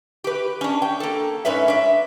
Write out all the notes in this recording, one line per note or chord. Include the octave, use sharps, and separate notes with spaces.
G4 B4
C#4 D4
G5
A#3 A4
G#2 C#4 B4 C#5 E5
D4 E5